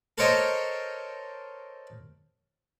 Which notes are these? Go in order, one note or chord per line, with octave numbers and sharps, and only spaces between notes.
A4 A#4 C5 C#5 D#5 G5